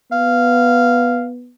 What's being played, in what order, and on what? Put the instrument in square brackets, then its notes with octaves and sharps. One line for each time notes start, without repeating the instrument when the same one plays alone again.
[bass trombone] B3 [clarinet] F5